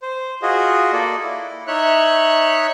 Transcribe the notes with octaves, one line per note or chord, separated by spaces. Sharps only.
C5
F4 F#4 G#4 D#5
A#3 A4 D5
E4
D#4 C#5 E5 F#6